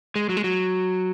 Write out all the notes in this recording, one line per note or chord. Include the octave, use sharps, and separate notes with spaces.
G#3
F#3
G#3
F#3